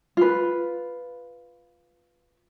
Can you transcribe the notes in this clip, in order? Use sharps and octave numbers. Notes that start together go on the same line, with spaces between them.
F4 B4